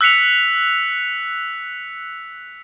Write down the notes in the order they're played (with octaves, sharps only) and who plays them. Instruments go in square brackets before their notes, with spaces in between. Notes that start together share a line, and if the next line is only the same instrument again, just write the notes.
[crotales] E6 F#6 B6 C#7 F7